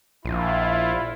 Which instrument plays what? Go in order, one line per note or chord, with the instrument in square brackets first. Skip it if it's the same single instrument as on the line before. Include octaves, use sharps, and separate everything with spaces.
[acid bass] A#1 [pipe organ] E4 F4